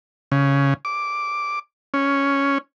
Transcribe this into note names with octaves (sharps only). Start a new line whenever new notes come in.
C#3
D6
C#4